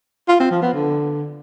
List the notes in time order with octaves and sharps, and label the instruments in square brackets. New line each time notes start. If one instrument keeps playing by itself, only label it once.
[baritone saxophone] F4
C4
F3
B3
D3